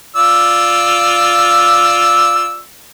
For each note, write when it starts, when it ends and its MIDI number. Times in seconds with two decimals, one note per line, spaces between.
0.16 2.60 65
0.16 2.60 74
0.16 2.60 88